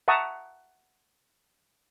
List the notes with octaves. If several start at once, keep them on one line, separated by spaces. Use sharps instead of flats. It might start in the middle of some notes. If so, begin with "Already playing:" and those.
E5 F#5 A5 A#5 C#6 D#6